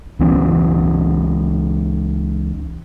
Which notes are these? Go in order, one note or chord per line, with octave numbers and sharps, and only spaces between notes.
C#2 E3 B3 C#4